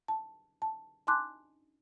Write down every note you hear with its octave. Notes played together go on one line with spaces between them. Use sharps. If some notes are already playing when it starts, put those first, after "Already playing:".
A5
A5
G#5 A5 C6 D6 F#6